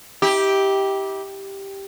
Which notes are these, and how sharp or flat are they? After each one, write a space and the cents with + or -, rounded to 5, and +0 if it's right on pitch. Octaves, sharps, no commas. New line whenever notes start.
E4 -45 G4 +0